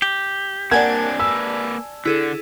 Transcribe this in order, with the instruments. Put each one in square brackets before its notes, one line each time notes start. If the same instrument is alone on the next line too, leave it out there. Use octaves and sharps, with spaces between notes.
[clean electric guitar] G4
[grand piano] A#3 F#5 G#6 [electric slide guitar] C4 D4 [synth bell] D5 G#5 A5
[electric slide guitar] A#3 B4 [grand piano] E6
[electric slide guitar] D3 [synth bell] E4 G#4 A4